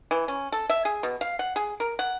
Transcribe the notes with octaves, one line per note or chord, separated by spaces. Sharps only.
E3
C#4
A4
E5
G#4
B2
F5
F#5
G#4
A#4
F#5